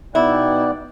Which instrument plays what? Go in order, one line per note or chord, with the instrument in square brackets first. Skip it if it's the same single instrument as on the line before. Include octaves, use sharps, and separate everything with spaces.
[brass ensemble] B2 D#4 G5 [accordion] B3 D5 F#6 [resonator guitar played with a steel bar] E4